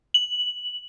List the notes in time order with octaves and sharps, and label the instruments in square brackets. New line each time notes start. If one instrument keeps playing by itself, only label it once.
[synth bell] F#7